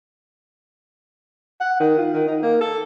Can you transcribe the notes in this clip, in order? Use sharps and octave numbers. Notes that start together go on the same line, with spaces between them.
F#5
D#3
F4
D#3
D#4
A#3
A4